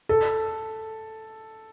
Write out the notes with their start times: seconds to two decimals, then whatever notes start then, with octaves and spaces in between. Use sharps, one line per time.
0.09 A4